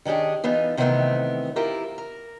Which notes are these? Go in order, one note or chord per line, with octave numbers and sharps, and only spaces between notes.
D#3 C#4 D4 G4 G#4
E3 B3 D#4 F4
C3 D#3 E3 A3 B3 C4
E4 F4 G4 A#4
A#4